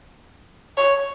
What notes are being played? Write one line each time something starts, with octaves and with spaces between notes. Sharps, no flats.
C#5